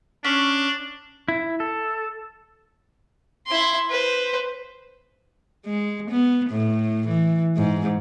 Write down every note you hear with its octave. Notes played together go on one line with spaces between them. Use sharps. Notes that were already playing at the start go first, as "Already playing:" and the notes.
C#4 D4
E4
A4
E4 C6
B4 C5
G#3
B3
A2
E3
G#2